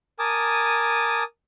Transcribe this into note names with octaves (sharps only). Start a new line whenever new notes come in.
A#4 G#5 A5 D6 D#6